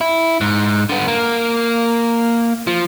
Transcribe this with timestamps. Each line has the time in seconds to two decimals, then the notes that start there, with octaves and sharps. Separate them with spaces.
0.01 E4
0.41 G#2
0.89 D3 B3
1.08 A#3
2.67 F3